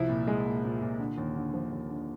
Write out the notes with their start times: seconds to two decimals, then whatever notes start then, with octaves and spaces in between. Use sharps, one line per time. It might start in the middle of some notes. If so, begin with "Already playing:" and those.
Already playing: C2 F3 E4
0.09 A#2
0.27 G#3
0.46 A#2
0.64 A#2
0.81 A#2
0.99 D3
1.18 D#2
1.35 D3
1.54 F3
1.71 D#2
1.89 D3